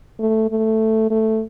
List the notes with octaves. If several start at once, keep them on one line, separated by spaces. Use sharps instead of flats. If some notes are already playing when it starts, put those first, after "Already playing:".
A3
A3
A3